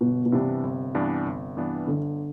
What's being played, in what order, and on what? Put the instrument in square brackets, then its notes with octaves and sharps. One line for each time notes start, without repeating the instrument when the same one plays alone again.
[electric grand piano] G1 [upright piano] B2
[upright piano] B2
[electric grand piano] G2 E3 B3 D4 [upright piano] C3
[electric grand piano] G1
G2 E3 B3 D4
G1
G2 E3 B3 D4
[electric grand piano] G1 [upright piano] D3